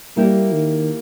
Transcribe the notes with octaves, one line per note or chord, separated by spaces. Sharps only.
G3 A#3 E4 G4 A#4
D#3